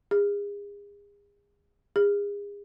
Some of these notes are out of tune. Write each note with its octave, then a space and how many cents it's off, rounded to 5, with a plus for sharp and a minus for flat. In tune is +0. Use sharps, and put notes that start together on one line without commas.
G#4 -35
G#4 -35